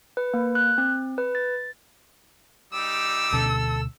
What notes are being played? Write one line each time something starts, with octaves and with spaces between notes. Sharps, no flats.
B4
A#3
F#6
C4
B4
A6
G3 D#4 D6 E6
D2 B2 C#4 A4